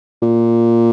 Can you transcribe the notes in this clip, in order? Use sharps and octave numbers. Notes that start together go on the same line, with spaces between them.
A#2